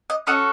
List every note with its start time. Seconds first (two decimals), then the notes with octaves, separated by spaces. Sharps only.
0.10 D#5
0.27 C#4 F#4 A4 D#5